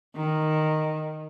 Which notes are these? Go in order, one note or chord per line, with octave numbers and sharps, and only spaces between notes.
D#3